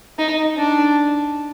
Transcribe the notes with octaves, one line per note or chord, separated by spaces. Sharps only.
D#4
D4